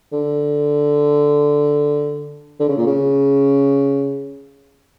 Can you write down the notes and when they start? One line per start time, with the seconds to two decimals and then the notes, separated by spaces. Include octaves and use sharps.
0.12 D3
2.60 D3
2.69 C#3
2.77 A#2
2.87 C#3